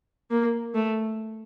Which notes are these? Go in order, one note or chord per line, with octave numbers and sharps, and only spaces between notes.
A#3
A3